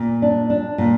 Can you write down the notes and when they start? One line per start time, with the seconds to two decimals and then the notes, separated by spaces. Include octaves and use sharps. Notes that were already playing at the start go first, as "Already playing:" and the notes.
Already playing: A#2
0.22 D4
0.50 D4
0.78 A#2